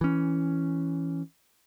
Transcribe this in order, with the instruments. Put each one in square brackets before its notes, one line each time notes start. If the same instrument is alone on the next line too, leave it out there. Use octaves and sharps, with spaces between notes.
[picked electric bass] E3 C#4